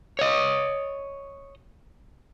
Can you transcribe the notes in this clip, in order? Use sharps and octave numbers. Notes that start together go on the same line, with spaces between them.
C#5 D#5